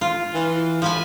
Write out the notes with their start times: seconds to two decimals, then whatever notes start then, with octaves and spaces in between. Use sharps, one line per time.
0.01 F4
0.34 E3
0.82 F3 B4 G#5